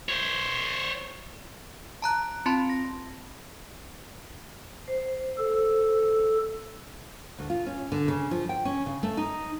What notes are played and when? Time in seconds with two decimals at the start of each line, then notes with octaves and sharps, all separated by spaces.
0.09 C5 C#5
2.02 A5 A#5 F#6
2.46 C4 F4 A5 B5 C6
2.70 A#6
4.88 C5
5.38 A4
7.39 D2
7.50 F4
7.66 C#4
7.92 D3
8.08 C#3
8.31 F3
8.49 G5
8.65 C#4
8.86 C#3
9.03 A3
9.17 D#4